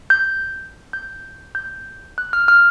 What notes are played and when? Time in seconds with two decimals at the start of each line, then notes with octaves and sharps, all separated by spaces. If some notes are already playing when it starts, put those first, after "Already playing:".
0.10 G6
0.93 G6
1.55 G6
2.18 F#6
2.33 F6
2.48 F6